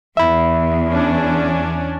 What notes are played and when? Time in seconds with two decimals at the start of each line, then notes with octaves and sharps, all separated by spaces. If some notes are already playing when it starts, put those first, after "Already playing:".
0.17 E2 E5 B5
0.89 C#4 D4